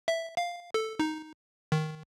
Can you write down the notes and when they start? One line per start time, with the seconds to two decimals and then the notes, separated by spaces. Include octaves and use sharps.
0.08 E5
0.37 F5
0.74 A4
0.99 D#4
1.72 D#3